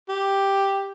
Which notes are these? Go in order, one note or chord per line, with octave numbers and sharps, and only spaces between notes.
G4